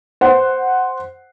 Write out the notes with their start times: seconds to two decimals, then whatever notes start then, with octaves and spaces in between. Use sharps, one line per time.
0.21 C5 F#5